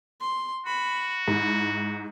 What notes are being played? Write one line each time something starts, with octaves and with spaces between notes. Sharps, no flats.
C6
F#4 B5
G#2 E4